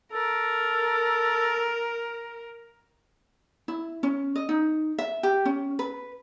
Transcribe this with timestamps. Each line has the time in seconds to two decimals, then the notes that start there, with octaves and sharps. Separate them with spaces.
0.13 A4 A#4
3.68 E4
4.03 C#4
4.36 D#5
4.49 D#4
4.98 E5
5.23 G4
5.45 C#4
5.79 B4